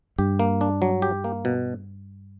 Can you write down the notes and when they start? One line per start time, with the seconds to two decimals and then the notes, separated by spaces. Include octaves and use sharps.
0.19 G2 G4
0.39 A#3
0.61 D4
0.82 F#3
1.02 G4
1.24 A#3
1.45 B2